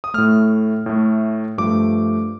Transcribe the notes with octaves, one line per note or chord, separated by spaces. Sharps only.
D#6
A2 A3 F6
A2 A3
G2 F3 A3 D6